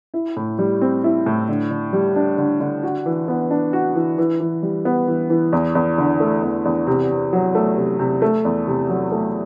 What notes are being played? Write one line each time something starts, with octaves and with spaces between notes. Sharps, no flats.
E4
A2
G3
C4
E4
A2
D3
D3
G3
D4
D3
D3
F#4
E3
B3
D4
F#4
E3
E3
E3
G3
B3
E3
E3
E2
E2
D3
A3
E2
E2
C3
C3
F#3
A3
C3
C3
A3
E2
C3
F#3
A3